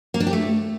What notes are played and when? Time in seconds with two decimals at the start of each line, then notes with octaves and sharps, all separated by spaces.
0.14 A#3
0.20 D4
0.27 G4
0.33 A3